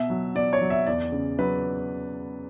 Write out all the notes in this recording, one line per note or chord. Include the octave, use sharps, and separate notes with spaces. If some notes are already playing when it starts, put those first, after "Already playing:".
Already playing: B2 E5
F#3
B2 D5
C#5
F#3
E5
E2 D5
C#3
F#3 B4